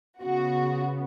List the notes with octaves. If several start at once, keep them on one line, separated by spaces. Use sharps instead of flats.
C#3 B3 F#4